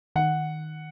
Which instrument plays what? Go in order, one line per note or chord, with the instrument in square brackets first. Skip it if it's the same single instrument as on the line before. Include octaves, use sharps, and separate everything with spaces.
[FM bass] D#3 [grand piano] F#5